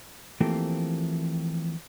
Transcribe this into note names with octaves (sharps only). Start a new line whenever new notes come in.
E3 F3 A3 A#3 C4 G4